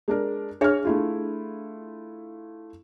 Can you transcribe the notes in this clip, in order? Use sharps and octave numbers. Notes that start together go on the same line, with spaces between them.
G#3 D4 A#4
D4 G#4 C#5 E5 F6
A3 E4 F4